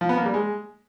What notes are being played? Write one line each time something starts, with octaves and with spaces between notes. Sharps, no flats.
F3
B3
A#3
G3
G#3